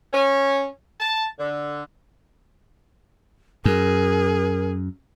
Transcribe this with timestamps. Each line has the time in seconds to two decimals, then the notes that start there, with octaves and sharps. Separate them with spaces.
0.13 C#4
1.00 A5
1.38 D3
3.65 F#2 G#4 A#4